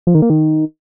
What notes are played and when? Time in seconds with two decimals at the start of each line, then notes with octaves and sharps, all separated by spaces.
0.07 F3
0.15 D#3
0.22 A#3
0.30 D#3